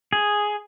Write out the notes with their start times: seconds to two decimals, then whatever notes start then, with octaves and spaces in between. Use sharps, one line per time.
0.13 G#4